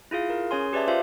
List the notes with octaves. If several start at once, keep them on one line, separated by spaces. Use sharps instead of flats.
E4 F4 G#4 F5
A#4
C#4 G#4 C#5 G#5 C6
G4 B4 D5 E5 A5
F4 C5 E5 F5